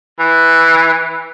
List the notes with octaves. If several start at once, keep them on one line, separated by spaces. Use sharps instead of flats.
E3